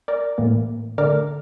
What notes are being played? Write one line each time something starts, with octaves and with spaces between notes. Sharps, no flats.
A#4 D5
A2 E3 A#3
D3 A3 A#4 D5